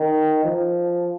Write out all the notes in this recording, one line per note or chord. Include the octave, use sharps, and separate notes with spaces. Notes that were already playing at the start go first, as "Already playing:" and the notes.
Already playing: D#3
F3